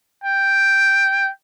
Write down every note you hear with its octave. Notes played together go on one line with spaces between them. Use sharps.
G5